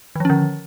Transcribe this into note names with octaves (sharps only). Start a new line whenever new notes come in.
D3 D#3 F3 C#4